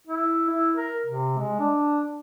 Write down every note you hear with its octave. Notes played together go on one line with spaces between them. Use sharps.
E4
E4
A#4
C3
G#3
D4